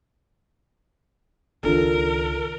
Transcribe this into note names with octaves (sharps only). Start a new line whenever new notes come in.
C#2 D#3 D4 F4 A4 A#4